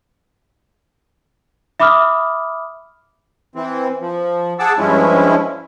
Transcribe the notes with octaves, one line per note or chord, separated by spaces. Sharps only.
E5 B5 D6 D#6 F6
E3 C4
F3
G#4 F#5 A5 D6 E6
G2 F3 G#3 C#4 E4